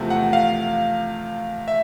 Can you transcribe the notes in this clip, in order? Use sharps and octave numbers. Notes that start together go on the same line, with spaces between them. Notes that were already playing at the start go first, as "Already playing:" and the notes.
Already playing: E2 C3 F3 A3
F#5
F5
E5